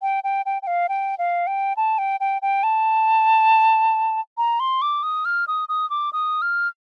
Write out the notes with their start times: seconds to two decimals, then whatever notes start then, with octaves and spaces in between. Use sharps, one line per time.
0.02 G5
0.24 G5
0.46 G5
0.62 G5
0.67 F5
0.89 G5
1.18 F5
1.47 G5
1.77 A5
1.98 G5
2.20 G5
2.42 G5
2.63 A5
4.38 A#5
4.60 C6
4.82 D6
5.03 D#6
5.25 F6
5.48 D#6
5.69 D#6
5.90 D6
6.13 D#6
6.42 F6